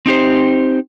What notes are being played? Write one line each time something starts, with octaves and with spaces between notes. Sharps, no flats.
C4 D#4 G4 C5